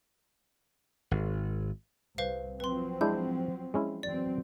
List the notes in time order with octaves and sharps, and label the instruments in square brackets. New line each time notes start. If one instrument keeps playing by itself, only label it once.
[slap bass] G#1
[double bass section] C2 [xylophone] B4 C5 F5
[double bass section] F3 F#3 C4 [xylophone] B4 C6
[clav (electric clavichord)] G#3 D4 E4 [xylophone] G6
[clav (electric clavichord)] G#3 C#4 E4
[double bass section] E2 F#3 C4 [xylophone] D5